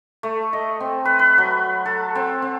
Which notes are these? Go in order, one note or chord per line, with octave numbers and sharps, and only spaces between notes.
A3
D#5
C4
B4
B4
F#3
A4
C4
C4